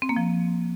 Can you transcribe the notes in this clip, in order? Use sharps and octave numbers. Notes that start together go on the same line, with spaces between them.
C4
A#3
F3